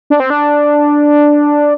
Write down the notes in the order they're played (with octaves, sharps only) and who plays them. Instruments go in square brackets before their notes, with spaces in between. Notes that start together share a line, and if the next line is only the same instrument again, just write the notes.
[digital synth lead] D4
C4
D4